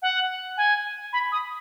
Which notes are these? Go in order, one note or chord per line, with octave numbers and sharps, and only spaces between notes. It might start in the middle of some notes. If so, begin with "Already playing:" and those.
F#5
G#5
B5
D#6